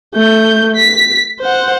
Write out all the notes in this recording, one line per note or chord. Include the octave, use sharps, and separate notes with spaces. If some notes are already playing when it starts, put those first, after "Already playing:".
A3 G6
B6
C5 F#5